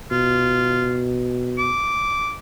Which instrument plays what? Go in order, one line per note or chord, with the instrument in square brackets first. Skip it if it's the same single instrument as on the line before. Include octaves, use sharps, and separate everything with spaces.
[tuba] B2 [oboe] F4
[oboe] D6